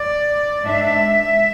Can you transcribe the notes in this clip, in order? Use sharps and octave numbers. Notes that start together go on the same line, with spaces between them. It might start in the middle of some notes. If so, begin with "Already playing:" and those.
Already playing: D5
G#2 G#3 D4 E5